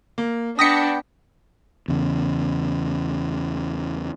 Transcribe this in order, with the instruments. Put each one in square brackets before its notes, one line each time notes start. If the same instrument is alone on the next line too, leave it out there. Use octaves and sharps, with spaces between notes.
[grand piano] A#3
[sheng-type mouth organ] B3 G5 [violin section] D4 [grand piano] D#6 [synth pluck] A#6 B6 C#7
[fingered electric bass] E2 C#3